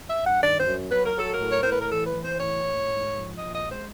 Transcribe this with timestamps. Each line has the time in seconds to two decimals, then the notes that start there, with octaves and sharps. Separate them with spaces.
0.09 E5
0.17 G2
0.25 F#5
0.42 D#3 D5
0.58 C5
0.66 F#2
0.91 F#3 B4
1.05 A#4
1.16 F#3 A4
1.32 A#4
1.40 A2
1.52 C#5
1.61 A2 C5
1.71 B4
1.80 A#4
1.89 E3 A4
2.06 B4
2.14 E3
2.23 C5
2.38 A2 C#5
2.63 A2
2.89 G#2
3.13 F3
3.37 A#2 D#5
3.54 D#5
3.62 G#3
3.70 C5